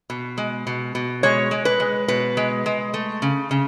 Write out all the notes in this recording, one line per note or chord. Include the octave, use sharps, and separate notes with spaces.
B2
G#3
B2
B2
G#3 C#5
G#3
B4
G#3
B2 B4
G#3
G#3
A3
C#3
C#3